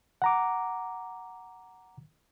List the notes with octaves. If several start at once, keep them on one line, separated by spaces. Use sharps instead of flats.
F#5 A#5 D6